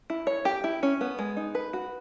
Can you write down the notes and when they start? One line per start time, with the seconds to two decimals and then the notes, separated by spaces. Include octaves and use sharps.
0.10 E4
0.27 C#5
0.45 G4
0.64 E4
0.83 C#4
1.01 B3
1.19 G#3
1.37 D#4
1.55 B4
1.73 F#4